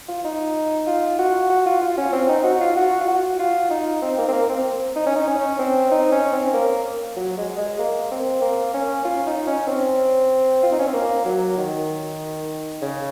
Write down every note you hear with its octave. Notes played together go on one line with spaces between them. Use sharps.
F4
D#4
F4
F#4
F#4
F4
F4
C#4
C4
D#4
F#4
F4
F#4
F4
F#4
F4
D#4
C4
A#3
C4
A#3
C4
D#4
C#4
D#4
C#4
C4
D#4
C#4
C4
A#3
F#3
G#3
G#3
A#3
C4
A#3
C#4
F4
D#4
C#4
C4
F4
D#4
C#4
C4
A#3
F#3
D#3
C#3